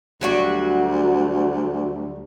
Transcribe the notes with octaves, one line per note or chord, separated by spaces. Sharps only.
D2 F#3 G3 F#4